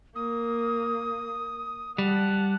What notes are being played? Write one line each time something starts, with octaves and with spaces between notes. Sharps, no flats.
A#3 D#6
G3 F#5 A5